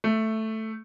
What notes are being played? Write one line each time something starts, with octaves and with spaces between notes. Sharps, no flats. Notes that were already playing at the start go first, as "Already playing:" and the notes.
A3